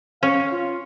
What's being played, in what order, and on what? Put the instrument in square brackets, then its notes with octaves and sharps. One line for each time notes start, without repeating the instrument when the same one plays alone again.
[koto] C#4 [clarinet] F5
[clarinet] F4